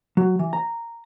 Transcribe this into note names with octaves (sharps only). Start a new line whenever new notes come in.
F#3
E3
A#5